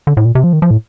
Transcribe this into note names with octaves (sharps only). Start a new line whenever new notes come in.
D3
A2
A#2
C3
F3
D#3
F3
A2